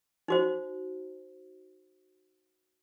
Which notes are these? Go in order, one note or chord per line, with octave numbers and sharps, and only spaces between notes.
D#4 F#4 C5